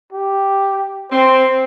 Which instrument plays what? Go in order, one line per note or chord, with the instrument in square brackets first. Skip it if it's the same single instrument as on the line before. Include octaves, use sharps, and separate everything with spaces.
[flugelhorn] G4
[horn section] C4 [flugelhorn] C5